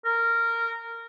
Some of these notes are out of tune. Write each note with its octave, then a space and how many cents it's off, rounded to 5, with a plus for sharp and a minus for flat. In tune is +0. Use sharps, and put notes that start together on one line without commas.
A#4 -15